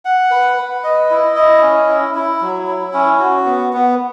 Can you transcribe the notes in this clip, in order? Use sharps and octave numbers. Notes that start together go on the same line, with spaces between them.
F#5
B4
B4
D#5
E4
D#5
C#4
E4
E4
F#3
E4
C#4
F#4
B3
B3